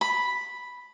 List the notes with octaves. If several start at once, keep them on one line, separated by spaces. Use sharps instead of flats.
B5